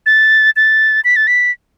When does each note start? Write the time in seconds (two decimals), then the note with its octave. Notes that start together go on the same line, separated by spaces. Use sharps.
0.06 A6
0.56 A6
1.05 B6
1.16 A6
1.27 B6